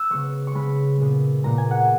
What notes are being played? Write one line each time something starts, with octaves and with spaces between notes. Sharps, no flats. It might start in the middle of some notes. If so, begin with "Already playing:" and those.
Already playing: E6 F#6
C#3 G#3 B3 C#6
C#6
C#3 G#3 B3 B5
A#2 G#3 B3
A#2 G#3 B3 A#5
G#5
F#5
G#5